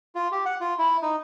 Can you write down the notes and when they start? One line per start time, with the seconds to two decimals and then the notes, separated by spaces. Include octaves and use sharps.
0.15 F4
0.32 G4
0.46 F#5
0.61 F4
0.78 E4
1.02 D#4